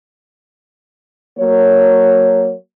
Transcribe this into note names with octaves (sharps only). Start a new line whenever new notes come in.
F#3 A#3 C#5